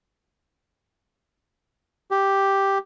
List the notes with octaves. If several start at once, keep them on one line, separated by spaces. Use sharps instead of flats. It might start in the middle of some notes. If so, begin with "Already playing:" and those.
G4